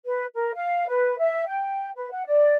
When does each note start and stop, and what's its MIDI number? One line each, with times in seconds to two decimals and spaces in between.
0.06 0.25 71
0.34 0.52 70
0.55 0.87 77
0.87 1.17 71
1.19 1.45 76
1.47 1.90 79
1.95 2.10 71
2.11 2.25 78
2.26 2.56 74